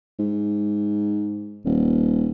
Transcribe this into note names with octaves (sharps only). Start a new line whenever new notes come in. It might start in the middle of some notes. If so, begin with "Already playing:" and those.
G#2
D#1